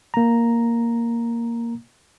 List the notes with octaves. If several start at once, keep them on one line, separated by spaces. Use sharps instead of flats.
A#3 A#5